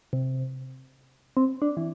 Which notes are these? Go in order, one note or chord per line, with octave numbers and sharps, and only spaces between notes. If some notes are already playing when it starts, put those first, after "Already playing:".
C3
C4
D4
E3